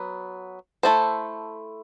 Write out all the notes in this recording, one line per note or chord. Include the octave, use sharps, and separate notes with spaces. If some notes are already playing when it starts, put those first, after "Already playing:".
Already playing: F#3 B3
A3 E4 A4 C5